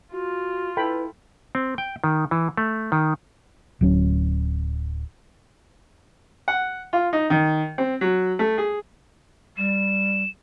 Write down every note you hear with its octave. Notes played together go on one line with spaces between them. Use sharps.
F4 F#4
E4 A4 B4 G5 B5
C4
G5
D#3
E3
A3
D#3
D1 F#3 C#4
F#5
F4
D#4
D#3
C4
F#3
A3
G#4
G3 E7